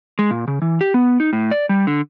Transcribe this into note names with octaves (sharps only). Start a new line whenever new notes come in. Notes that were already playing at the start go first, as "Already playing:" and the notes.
G#3
A#2
C#3
E3
G4
B3
D#4
A2
D5
G3
D3